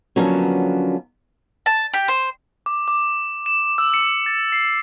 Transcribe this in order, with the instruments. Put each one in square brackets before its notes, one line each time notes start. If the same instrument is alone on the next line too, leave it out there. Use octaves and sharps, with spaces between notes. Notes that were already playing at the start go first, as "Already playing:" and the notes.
[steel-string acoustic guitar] D3 F3 F#3 A#3 B3 C#4
[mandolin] A5
G4
C5
[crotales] D6
D6
E7
E6
C#7
A6
C7